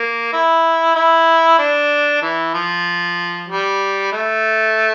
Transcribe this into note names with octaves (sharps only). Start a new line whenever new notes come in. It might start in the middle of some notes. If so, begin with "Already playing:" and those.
Already playing: A#3
E4
E4
D4
E3
F3
G3
A3